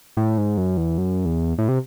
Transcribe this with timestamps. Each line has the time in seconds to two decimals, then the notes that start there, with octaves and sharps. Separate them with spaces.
0.17 A2
0.38 G#2
0.57 F#2
0.77 E2
0.98 F#2
1.25 E2
1.58 A2
1.68 C3